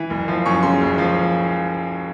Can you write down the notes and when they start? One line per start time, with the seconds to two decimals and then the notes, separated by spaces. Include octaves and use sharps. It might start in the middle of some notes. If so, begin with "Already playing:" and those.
Already playing: E3
0.10 F#1
0.28 F3
0.46 F#2 C#6
0.63 C#3 C6
0.81 F#1
0.98 F3